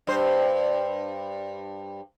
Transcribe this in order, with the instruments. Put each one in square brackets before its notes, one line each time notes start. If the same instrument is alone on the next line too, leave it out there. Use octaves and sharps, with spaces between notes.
[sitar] G2 C5